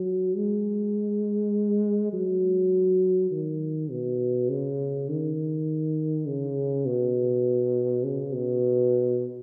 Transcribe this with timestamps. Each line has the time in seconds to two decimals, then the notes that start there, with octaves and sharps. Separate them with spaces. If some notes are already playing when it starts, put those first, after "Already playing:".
Already playing: F#3
0.36 G#3
2.13 F#3
3.31 D#3
3.91 B2
4.49 C#3
5.09 D#3
6.27 C#3
6.86 B2
8.04 C#3
8.33 B2